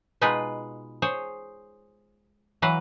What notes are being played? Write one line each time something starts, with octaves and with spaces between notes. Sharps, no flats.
B2 G#3 D#4 F4 G#4 B4
G#4 C5 C#5
E3 F#3 B4 F5 A#5